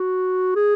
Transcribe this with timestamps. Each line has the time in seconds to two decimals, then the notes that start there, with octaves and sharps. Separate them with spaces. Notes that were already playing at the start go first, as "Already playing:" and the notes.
Already playing: F#4
0.56 G#4